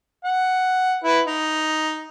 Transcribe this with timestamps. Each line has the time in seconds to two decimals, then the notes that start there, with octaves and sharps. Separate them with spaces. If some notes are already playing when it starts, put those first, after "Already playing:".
0.24 F#5
1.04 E4 B4
1.27 D#4